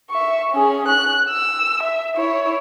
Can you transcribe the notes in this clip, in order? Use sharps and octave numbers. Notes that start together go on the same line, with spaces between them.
E5 C#6
C#4 G#4
F#6
E6
E5
E4 C#5